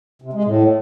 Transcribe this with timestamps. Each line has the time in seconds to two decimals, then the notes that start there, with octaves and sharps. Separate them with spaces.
0.22 C3
0.33 G#3
0.45 A2